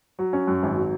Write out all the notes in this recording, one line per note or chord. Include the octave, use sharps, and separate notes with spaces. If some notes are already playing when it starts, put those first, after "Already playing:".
F#3
C#4
F#2
G#1
F#3